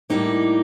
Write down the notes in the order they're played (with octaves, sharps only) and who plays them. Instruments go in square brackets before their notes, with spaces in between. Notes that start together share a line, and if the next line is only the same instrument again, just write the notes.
[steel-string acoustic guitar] A2 G3 A#3 D#4